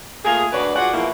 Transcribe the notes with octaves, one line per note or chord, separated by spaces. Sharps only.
A3 A#3 F4 G#4
D2 D4 F#4 B4 C#5 D5
G#3 F4 F#4 G#4 D5 F#5
G#2 B2 E3 F3 A#3 E4